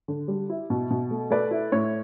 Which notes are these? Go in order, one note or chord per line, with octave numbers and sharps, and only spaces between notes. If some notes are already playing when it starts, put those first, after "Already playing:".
D3
G3
E4
B2
B2
A3
A3 B4 D5
E4
A2 C#5